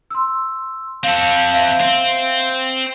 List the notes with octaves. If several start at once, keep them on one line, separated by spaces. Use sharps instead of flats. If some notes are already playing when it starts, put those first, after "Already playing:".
C6 E6
C4 A4 F5
E5 F5
C4